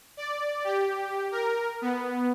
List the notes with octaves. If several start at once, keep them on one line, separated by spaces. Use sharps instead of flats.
D5
G4
A#4
B3